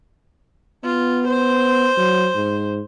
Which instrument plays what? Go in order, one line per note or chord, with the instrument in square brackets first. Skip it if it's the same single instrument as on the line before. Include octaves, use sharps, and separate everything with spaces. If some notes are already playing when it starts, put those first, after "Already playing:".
[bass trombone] B3 [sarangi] F4
[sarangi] C5
[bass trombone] F#3
G#2